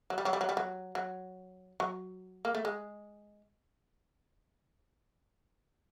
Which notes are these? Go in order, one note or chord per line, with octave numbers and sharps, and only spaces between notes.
F#3
G3
F#3
G3
F#3
G3
F#3
F#3
F#3
A#3
A3
G#3